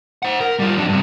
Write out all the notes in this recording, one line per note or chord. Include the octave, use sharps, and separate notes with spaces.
C5 F#5
A#4
G3 F4
F2 D4
G2 C3